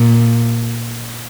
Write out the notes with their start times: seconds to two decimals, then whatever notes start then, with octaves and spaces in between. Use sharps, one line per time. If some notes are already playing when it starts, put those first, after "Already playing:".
Already playing: A#2